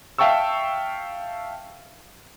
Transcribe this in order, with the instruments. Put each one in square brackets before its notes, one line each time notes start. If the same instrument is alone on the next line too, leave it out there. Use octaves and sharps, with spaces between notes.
[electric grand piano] E5 F5 G5 A5 C#6 E6